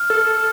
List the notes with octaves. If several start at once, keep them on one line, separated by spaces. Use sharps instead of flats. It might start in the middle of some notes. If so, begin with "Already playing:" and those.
Already playing: F6
A4